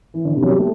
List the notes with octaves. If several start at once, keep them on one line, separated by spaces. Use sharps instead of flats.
E3
D3
C3
F#3
G3
A3